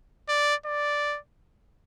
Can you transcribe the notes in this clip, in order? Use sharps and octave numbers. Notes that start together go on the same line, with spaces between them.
D5
D5